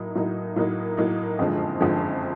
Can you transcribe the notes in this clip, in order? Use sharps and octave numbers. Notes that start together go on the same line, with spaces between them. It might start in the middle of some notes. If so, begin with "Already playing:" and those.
Already playing: A2 F#3 A#3 D#4
A2 F#3 A#3 D#4
A2 F#3 A#3 D#4
A2 F#3 A#3 D#4
F#1 F2 D3 F3 G#3
F#1 F2 D3 F3 G#3